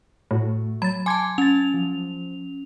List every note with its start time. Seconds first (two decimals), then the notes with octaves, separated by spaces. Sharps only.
0.31 A2 A3 F#4
0.82 F#3 B5 A6
1.06 G#5 A5 C6 D6 G#6
1.38 C#4 G#6 A6 F7
1.74 F3